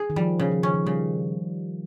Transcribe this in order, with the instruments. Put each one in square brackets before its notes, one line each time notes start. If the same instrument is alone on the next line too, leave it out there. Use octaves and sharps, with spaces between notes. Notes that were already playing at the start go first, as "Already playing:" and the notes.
Already playing: [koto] G#4
[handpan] D#3
[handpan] F3 [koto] G3
[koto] C#3
[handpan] F3
[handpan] D#3 [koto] C#4
[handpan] F3
[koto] C#3 [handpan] G3